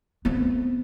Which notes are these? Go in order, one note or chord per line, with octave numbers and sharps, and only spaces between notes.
B3 C4